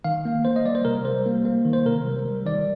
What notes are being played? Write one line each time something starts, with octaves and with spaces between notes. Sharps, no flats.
D#3 F5
A#3
A#3 C5
D#5
G3 D5
C5
C3 A#4
G3 C5
A#3
A#3
D#3
C5
C3 A#4
G3
G3
D#3 D5